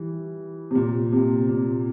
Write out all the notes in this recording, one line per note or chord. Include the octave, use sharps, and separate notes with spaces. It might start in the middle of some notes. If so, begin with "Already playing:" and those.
Already playing: E3 G3
C3
A#2
C3
A#2